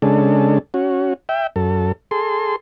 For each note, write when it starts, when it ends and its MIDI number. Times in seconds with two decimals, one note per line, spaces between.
0.02 0.58 49
0.02 0.58 56
0.02 0.58 62
0.02 0.58 69
0.74 1.14 61
0.74 1.14 66
1.29 1.47 76
1.29 1.47 79
1.56 1.92 42
1.56 1.92 69
2.11 2.56 68
2.11 2.56 69
2.11 2.56 84